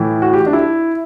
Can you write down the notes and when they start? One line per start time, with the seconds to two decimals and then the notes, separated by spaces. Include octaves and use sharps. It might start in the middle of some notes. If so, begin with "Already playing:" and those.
Already playing: A2 E3
0.22 F#4
0.33 G4
0.46 D4
0.53 E4